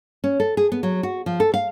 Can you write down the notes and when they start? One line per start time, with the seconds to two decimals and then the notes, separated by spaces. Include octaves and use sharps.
0.24 C#4
0.40 A4
0.57 G#4
0.72 B3
0.83 F#3
1.03 F#4
1.26 F3
1.40 A4
1.54 F5